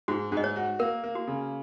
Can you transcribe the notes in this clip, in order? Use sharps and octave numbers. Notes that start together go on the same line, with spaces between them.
G#2 F#4
G#2
D#5
C#5
F#4
A#3 A#4
A#3
F#4
C#3